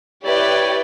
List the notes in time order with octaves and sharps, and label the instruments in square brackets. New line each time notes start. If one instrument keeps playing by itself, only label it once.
[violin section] E4 B4 G5 [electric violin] G4 D5 [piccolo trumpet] C#5